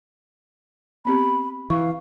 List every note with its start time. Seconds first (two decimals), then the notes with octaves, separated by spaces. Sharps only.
1.05 B3 C4 G4 B5
1.70 E3 F5 C#6